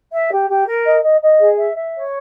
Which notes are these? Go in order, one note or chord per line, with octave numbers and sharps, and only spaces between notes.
E5
G4
G4
A#4
D#5
D#5
D#5
G#4
E5
E5
C#5